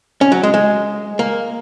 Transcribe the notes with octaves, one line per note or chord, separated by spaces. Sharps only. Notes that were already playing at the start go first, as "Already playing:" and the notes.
C#4
F#3
G#3
G#3
A#3